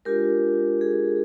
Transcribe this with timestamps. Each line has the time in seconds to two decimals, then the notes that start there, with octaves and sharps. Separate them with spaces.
0.05 G#3 D4 F4 G4 A#4
0.81 G#4